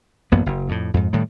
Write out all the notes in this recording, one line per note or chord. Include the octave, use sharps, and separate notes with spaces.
A1 F#2 A#3 B3
F#1
F2 A2
F2 G#2
A2 D#3 G3